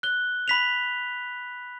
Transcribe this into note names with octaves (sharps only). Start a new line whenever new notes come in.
F#6 G7
B5 B6 F7